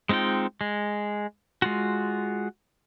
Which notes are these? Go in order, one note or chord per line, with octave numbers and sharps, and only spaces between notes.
G#3 C4 D#4 F4 G5
G#3
G#3 F4 F#4